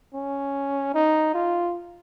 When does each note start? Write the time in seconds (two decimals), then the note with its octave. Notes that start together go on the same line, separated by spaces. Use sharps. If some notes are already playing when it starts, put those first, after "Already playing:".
0.14 C#4
0.94 D#4
1.34 F4